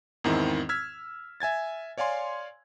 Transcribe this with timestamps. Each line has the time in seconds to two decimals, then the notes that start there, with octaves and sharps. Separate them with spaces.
0.24 E2 G#2 D#3 C4 E4
0.69 E6 F6 G#6 B6
1.40 E5 G#5 G#6 A6
1.98 C#5 D5 F5 G#5 C6